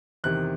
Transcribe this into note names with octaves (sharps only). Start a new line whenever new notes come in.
E2 C3 D#3 F#6